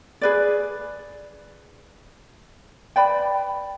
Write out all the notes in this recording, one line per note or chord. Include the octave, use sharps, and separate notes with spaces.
G#4 B4 D5
B4 D5 G5 B5